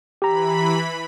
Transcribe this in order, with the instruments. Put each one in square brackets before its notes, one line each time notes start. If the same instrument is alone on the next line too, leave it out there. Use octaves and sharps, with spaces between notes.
[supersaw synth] E3 B5 [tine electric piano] G4 A#5